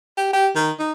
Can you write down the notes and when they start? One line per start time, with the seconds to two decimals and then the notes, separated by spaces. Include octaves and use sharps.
0.18 G4
0.34 G4
0.56 D#3
0.79 D#4